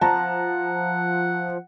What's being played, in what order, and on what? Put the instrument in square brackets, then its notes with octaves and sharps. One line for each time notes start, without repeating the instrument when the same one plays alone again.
[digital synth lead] F3 [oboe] F#5 [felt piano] A5 A#5